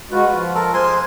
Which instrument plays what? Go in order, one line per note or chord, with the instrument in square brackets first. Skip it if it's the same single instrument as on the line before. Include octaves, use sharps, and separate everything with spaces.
[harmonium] G#3 F#4 [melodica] F4 B4
[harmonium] F3
[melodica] A4 A#4
[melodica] G#3 G#5 C6 [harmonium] C5